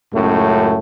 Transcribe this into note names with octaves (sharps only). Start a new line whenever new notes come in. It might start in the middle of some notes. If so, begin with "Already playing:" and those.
C#2 F#2 A2 A3